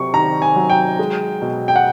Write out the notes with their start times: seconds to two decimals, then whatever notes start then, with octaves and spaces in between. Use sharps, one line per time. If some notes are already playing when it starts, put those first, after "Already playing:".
Already playing: C3 F#3 C#6
0.14 D#3 A#5
0.42 G#5
0.56 F#3
0.70 G5
0.99 G#3
1.42 B2
1.68 G5
1.76 F#5